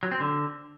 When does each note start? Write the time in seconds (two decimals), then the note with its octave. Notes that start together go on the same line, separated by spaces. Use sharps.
0.03 F#3
0.12 C4
0.20 D3